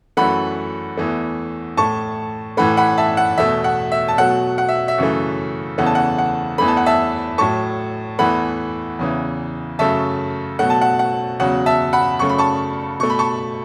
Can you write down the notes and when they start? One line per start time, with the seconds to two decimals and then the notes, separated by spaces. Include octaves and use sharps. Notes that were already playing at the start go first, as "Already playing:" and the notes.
0.17 F#2 E3 A3 F#5 B5
0.97 E2 E3 A3
1.77 A2 A3 A5 C#6
2.57 A2 E3 A3 F#5 B5
2.77 F#5 B5
2.98 E5 A5
3.17 F#5
3.38 E2 B2 A3 E5
3.64 F#5
3.92 E5
4.08 A5
4.17 B2 F#3 A3 F#5
4.58 F#5
4.68 E5
4.88 E5
4.98 F#2 C#3 E3 A3
5.78 E2 C#3 E3 A3 F#5
5.86 A5
5.95 F#5
6.18 F#5
6.58 E2 E3 A3 B5
6.68 A5
6.77 F#5
6.86 E5 A5
7.38 A2 F#3 A3 A5 C#6
8.19 E2 E3 A3 F#5 B5
8.99 E2 C#3 E3
9.79 F#2 C#3 F#3 A3 E5 A5
10.59 B2 F#3 A3 F#5
10.70 A5
10.81 F#5
10.99 F#5
11.40 E2 C#3 F#3 F#5
11.66 E5 A5
11.93 F#5 B5
12.19 F#2 C#3 A3 C#6
12.29 B5
12.38 A5 C#6
13.00 B2 A3 C#6
13.10 B5
13.19 A5 C#6